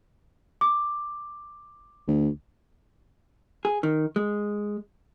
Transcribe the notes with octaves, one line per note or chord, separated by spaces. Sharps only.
D6
D2
G#4
D#3
G#3